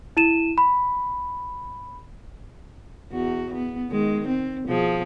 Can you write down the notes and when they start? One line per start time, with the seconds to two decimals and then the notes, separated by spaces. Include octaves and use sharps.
0.17 E4 D#7 E7
0.58 B5
3.11 E2 F#4
3.53 B3
3.89 D#3 G#3
4.27 C4
4.66 B2 F3 G#4